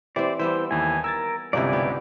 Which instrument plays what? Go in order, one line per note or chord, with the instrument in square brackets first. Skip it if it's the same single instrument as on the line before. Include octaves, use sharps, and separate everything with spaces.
[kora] E3 C4 [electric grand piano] G4 [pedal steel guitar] C5 D5
[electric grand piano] E3 [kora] G3 B3 E5 [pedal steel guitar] C5
[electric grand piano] D#2 E3 [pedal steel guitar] G#5
[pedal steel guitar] A#4 [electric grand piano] E6 G#6 A6
[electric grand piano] G1 C#2 C3 [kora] F3 D#4 E4 [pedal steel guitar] D5 G#5
[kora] B3 G4